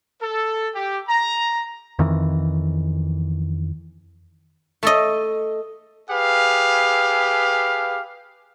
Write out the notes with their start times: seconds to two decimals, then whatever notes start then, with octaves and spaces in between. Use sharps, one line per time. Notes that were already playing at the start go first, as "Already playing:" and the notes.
0.21 A4
0.74 G4
1.08 A#5
1.99 F2 D#3 E3
4.83 A3 A4 D#5
6.09 G4 G#4 B4 F5